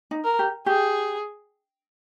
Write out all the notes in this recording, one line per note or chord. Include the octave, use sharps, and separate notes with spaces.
D#4
A#4
G4
G4 G#4